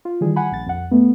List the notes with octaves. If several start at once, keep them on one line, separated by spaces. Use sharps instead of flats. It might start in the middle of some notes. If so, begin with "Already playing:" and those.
F4
D#3 E3 G3 G#4
F#5 G#5 B5
A#1 A6
F2 F#5
A3 B3